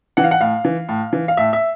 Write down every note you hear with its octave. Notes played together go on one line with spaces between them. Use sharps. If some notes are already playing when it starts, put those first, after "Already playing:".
E3 F#5
F5
F#5
A2 F5
E3
A2
E3
F5
A2 E5
E5